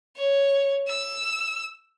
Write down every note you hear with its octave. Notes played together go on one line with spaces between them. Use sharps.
C#5
E6